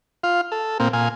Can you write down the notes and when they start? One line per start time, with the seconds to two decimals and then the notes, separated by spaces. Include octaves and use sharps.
0.24 F4 F5
0.52 A4
0.80 A#2 A#3 C4
0.93 A#2 F5 G#5